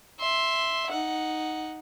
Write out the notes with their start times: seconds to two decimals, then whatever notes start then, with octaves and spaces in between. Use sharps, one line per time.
0.20 E5 C6
0.90 D#4 F#5